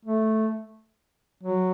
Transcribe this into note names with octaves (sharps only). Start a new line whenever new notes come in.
A3
F#3